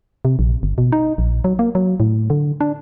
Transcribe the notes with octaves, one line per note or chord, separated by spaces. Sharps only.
C3
A#1
G1
B2
D#4
A#1
F#3
A#3
F#3
A2
D3
D4